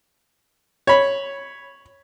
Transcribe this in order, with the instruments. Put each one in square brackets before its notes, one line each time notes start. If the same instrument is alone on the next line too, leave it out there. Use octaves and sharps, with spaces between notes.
[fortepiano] C#5 B5